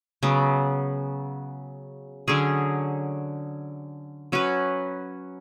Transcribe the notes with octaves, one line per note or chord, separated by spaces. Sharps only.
C#3 F#3 B3
D3 F#3 C#4 G#4
F#3 C#4 F#4 B4